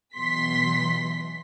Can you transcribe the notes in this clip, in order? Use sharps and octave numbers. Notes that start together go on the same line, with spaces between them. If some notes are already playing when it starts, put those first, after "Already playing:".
B2 E3 F#3 C6 B6